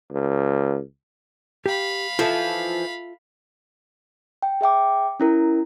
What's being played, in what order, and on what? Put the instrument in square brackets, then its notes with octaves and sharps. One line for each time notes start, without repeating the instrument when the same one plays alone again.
[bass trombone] C#2
[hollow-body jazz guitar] G4 [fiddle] F5 B5
[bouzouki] E3 F3 [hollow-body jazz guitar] F4 A4 E5
[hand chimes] G5
G#4 E5 G5 D6
C#4 E4 A#4